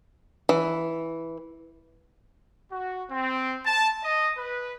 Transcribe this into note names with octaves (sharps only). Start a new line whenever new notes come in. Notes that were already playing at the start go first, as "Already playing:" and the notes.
E3
F#4
C4
A5
D#5
B4